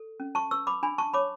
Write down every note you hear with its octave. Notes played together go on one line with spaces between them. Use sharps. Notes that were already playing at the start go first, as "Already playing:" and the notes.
Already playing: A4
C#4
A5 C#6
B4 C#6 E6
B5 D6
D4 G#5 B5
A5 C#6
C#5 B5 D6